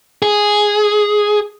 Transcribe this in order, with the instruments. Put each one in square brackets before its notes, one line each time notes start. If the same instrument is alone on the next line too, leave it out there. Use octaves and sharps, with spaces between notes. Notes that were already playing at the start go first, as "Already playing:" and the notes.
[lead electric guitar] G#4